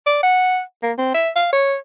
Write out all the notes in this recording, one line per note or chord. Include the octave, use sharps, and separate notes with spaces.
D5
F#5
A#3
C4
E5
F5
C#5